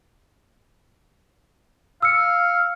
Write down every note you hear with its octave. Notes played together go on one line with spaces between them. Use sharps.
F5 E6 C#7